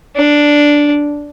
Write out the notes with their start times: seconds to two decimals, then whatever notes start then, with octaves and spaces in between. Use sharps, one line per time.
0.17 D4